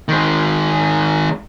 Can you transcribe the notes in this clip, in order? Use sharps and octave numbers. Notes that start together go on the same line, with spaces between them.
D#3 G#3